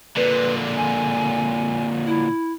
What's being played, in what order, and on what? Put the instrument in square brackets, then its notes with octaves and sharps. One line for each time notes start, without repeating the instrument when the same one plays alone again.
[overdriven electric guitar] A#2 D3 [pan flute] B4
[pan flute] G#5
E4